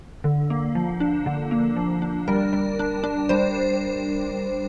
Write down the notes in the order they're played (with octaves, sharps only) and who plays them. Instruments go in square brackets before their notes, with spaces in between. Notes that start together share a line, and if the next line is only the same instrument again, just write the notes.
[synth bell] D3
A#3
F3
D4
D3
A#3
F3
D4
G3 A#4
G3
D4
D4
G3 C5